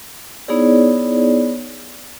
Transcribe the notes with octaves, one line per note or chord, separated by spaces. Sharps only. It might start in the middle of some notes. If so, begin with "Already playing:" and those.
B3 D#4 E4 G#4 C#5 D5